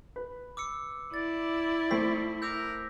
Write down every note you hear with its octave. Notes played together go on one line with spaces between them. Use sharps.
B4
D6 E6 C#7
E4 D5 A6
A3 C4 B6
A#4 D6 E6 G6